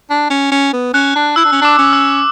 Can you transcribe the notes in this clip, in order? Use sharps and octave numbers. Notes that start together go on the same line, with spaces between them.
D4
C#4
C#4
B3
C#4 F#6
D4
E4 E6
D4
C#4
D4 D6
C#4
E6